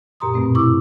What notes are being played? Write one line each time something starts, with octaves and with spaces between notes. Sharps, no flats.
F#2 A#2 G4 A#5 C6 D#6
G2 B2 A3 C4
E4 C#6 D6 E6